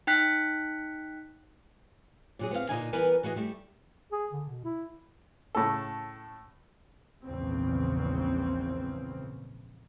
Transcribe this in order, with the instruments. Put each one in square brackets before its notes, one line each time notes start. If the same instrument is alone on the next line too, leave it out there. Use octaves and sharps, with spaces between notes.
[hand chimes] D#4 G5 F#6 B6
[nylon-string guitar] A#2 F#3 G#4
B3 C4 A4 F5
A#2 D3 A#3 D#4 D#5 G#5
E3 G3 B3 A#4 B4 G#5
E3 F#4 G#4 D5 D#5
G3 A3
[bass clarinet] G#4
D3
B2
E4
[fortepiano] A2 C#3 A4
[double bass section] A#1 E2 G#2 C#3 E3 C4